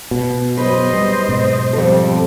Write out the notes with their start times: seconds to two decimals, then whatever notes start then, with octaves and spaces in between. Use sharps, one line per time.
0.11 B2
0.57 F#2 B4 C5 D#5
0.93 G3
1.28 G#2 B2 F#3
1.73 F2 G3 C4 A4